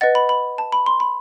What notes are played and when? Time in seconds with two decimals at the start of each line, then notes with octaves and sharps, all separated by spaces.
0.01 B4 D#5 F#5 A6
0.15 B5
0.29 B5
0.58 A5
0.72 B5
0.86 C6
1.00 B5